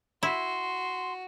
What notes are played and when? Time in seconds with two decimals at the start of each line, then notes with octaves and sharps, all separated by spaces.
0.23 E4 F#4 C6